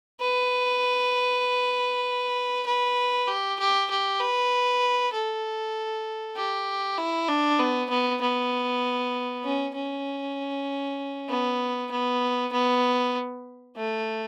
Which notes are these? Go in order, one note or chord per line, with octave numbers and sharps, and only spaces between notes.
B4
B4
G4
G4
G4
B4
A4
G4
E4
D4
B3
B3
B3
C#4
C#4
B3
B3
B3
A3